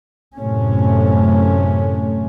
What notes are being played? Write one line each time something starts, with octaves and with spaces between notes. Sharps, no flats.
F#2 A2 C3 A3 C#4